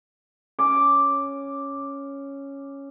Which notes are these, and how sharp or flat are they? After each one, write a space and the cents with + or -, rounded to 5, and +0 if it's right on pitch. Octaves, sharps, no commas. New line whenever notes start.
C#4 +0 D6 +0